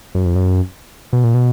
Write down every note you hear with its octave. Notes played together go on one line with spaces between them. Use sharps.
F#2
F2
F#2
B2
A#2
B2